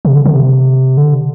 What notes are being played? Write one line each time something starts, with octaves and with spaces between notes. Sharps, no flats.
C3
D3
D3
C3
D3